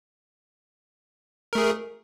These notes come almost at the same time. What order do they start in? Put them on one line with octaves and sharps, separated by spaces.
A#4 A3 G#4